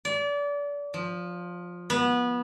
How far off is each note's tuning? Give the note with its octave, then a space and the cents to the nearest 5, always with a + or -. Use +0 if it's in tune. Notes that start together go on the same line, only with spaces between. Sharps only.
D5 -30
F3 +15
B3 -20